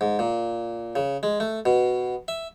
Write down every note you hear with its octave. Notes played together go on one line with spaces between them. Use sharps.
G#2
A#2
C#3
G#3
A3
B2
E5